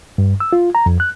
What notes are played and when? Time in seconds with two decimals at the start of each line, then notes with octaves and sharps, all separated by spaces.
0.18 G2
0.40 E6
0.53 F4
0.75 A#5
0.86 F2
1.00 F#6